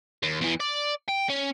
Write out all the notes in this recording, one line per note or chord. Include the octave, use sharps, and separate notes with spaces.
D#2
E2 E3
D5
G5
C#4